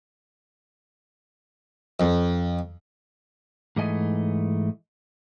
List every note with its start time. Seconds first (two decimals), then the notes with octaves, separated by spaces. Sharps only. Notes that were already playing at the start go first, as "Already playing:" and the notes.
2.00 F2
3.76 G#2 E3 A3 D#5 G#5